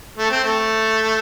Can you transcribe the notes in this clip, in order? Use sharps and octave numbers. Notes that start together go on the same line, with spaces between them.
A3
C4
A3